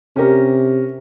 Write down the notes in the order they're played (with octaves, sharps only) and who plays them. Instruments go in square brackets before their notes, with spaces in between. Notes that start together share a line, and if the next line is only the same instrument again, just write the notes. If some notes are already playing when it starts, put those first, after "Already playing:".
[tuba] C3 [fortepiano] C#4 G4 A#4